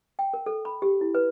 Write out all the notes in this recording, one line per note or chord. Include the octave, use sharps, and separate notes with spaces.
G5
A#4
A4
B5
G4
E4
B4